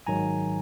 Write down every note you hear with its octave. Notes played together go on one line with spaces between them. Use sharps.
G#1 G#2 D#3 F#3 G#5 A#5